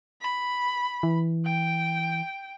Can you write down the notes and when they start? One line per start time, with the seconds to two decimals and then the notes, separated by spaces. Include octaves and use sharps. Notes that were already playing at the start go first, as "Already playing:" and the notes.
0.21 B5
1.03 E3
1.46 G5